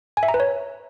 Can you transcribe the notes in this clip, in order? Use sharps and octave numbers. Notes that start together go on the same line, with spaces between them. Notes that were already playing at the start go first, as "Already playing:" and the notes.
G#5
E5
A#5
B4
C#5